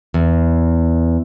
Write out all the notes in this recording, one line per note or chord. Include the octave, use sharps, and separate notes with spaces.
E2